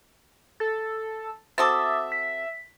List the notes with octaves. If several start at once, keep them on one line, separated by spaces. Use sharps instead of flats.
A4 A6
C4 F#4 A4 E5 D6 D#6 A6
B6